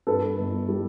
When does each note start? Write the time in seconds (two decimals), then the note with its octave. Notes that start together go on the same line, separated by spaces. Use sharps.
0.07 G2 A4 B4
0.38 G1
0.69 G3